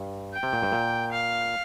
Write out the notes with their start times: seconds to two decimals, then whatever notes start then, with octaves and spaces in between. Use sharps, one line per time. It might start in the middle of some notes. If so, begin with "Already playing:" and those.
Already playing: G2
0.33 G5
0.43 C3
0.53 A#2
0.62 G2
0.72 A#2
1.12 F5